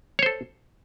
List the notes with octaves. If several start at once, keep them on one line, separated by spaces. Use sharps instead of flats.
A4 C5 C#5